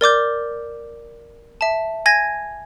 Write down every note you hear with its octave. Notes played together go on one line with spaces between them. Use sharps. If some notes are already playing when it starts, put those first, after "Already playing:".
A#4 D5 D6 G6
E5 A5
G#5 G#6 A#6